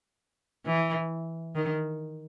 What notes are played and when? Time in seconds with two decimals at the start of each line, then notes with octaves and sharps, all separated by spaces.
0.66 E3
1.55 D#3